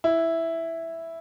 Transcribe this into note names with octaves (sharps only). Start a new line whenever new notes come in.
E4